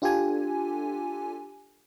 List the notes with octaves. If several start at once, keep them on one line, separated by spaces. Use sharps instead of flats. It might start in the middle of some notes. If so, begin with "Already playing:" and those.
D4 F4 G4 A4 G#5